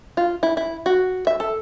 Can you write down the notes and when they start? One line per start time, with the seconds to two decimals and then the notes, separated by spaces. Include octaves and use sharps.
0.17 F4
0.43 E4
0.57 E4
0.86 F#4
1.27 E5
1.40 A4